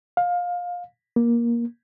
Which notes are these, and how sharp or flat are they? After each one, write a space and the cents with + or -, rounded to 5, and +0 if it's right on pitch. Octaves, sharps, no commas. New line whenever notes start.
F5 +20
A#3 +15